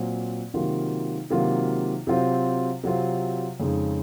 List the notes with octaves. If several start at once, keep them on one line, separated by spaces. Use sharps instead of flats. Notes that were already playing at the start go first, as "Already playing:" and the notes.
Already playing: A#2 F#3 C4
C3 D#3 F#3 A#3 F4
C3 D#3 F#3 A#3 F4
C3 F#3 C4 F4
C3 F#3 C4 F4
F2 C#3 G#3 D#4